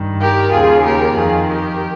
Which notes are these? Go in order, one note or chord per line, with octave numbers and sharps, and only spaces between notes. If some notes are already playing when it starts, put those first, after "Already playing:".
Already playing: G2 D#3
G4 A#4
D#2 C#3 F4 G#4
G4 A#4
F2 D#3 F4 G#4
G4 A#4